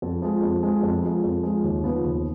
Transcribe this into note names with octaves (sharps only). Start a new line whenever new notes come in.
F2
F3 G#3
F2
F3 G#3
F2
F3 G#3
F2
F3 G#3
D#2
C#3 F3 B3
D#2